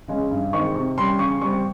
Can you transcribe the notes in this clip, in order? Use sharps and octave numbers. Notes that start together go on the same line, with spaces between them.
C#3 G#3 C#4
G2
D#3 G#3 C4 C#6
C3 C#6
G3 C#4 C6
C#3 C#6
G3 C4 C#6